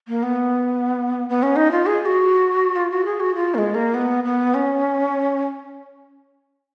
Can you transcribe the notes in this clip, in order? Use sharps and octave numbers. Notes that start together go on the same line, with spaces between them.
A#3
B3
B3
C#4
D#4
F4
G#4
G#4
F#4
F4
F#4
G#4
F#4
F4
A#3
G#3
A#3
B3
B3
C#4